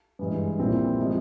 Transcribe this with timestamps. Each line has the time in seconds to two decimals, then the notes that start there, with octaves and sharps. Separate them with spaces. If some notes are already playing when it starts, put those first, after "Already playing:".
0.19 G2 E3 G#3
0.59 A#1 A#2 G3 C4 E4
0.99 C3 F3 G#3